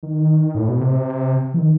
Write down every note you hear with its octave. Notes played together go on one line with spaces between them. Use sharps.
D#3
A2
B2
C3
E3
D#3